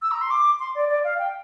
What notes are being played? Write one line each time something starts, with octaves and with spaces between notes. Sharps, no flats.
E6
A#5
C6
D6
C6
D5
D5
F5
G5